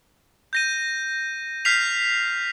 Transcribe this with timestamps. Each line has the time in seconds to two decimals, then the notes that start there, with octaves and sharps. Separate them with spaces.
0.53 G6 A#6 D#7
1.65 F6 G6 B6 C7 F7